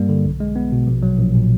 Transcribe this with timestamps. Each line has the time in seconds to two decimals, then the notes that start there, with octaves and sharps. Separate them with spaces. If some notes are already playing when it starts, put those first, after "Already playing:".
Already playing: G2 G3 A#3
0.09 D3
0.25 B1
0.40 G#3
0.56 B3
0.72 B2
0.87 A#1
1.03 F#3
1.19 A#1
1.35 A#2